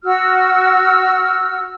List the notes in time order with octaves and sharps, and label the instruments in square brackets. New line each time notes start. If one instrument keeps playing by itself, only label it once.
[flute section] F#4 E6 F6